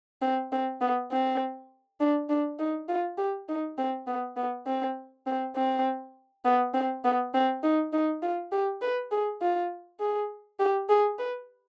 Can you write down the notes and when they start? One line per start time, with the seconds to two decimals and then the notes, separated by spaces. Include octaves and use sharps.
0.22 C4
0.52 C4
0.81 B3
1.11 C4
2.00 D4
2.29 D4
2.59 D#4
2.89 F4
3.18 G4
3.49 D#4
3.78 C4
4.07 B3
4.37 B3
4.66 C4
5.27 C4
5.56 C4
6.45 B3
6.74 C4
7.05 B3
7.34 C4
7.63 D#4
7.93 D#4
8.23 F4
8.52 G4
8.82 B4
9.11 G#4
9.42 F4
10.00 G#4
10.60 G4
10.89 G#4
11.19 B4